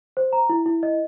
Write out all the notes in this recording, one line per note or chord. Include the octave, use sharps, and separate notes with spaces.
C5
A#5
E4
E4
D#5